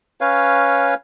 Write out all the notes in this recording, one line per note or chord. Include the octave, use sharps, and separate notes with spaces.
C#4 B4 C#5 F5